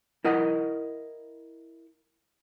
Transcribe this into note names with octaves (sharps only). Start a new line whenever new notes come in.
E4 A#4 D#5 F#5